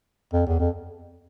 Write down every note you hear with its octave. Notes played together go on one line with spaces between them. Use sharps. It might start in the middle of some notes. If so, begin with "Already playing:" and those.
F2
E2
F2